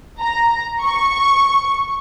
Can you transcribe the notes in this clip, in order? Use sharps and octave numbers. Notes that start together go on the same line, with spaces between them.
A#5
C#6